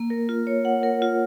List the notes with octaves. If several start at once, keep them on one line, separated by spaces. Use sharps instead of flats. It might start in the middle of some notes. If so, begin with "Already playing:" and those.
Already playing: A#3
A#4
F4
C#5
F#5
A#4
F4